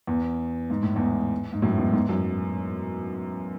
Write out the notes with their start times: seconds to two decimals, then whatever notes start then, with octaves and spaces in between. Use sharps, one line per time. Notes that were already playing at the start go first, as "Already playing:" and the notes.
0.07 E2
0.70 G#2
0.83 A2
0.96 E2 G#2
1.53 G#2
1.62 F#2 A2
1.78 E2 G#2
1.93 E2 G#2
2.09 F#2